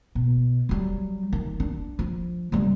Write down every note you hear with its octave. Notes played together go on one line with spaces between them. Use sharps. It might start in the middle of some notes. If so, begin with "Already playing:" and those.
B2
F#3 G3
D#3
D4
F3
C#3 G3